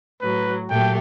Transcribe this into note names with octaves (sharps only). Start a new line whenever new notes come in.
A2 F#3 B4
A#2 F#3 A3 G4 G5